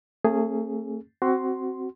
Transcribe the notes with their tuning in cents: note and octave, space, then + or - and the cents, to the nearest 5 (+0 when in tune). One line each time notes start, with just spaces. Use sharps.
A3 +35 C4 +45 G#4 +0
C4 +0 F#4 +15 C6 +0